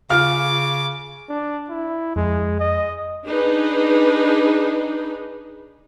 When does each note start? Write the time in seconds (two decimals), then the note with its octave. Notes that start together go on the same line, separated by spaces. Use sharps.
0.10 C#3 F4 D6 F6
1.29 D4
1.69 E4
2.16 F2 G#3
2.60 D#5
3.26 D4 D#4 G#4 B4